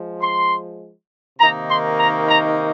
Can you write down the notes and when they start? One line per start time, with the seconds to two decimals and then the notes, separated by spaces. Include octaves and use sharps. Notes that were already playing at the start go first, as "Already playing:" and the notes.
Already playing: F3 G#3
0.21 C6
1.39 C3 D#3 A#3 D#4 A#5
1.69 C6
1.98 A#5
2.27 A#5